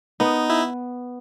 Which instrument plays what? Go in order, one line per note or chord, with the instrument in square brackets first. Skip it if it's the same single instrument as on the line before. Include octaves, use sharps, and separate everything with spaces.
[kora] B3 [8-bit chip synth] D#4
[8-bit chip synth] E4